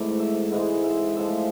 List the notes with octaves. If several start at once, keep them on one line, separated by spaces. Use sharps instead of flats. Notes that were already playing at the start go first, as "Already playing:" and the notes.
Already playing: G#2 C3 E3 A3 D5
E5
G#2 E3 G#3
E5
A2 F3 G#3 E5